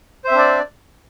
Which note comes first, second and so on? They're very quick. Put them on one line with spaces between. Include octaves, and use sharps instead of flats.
C5 E5 C4 D4 D5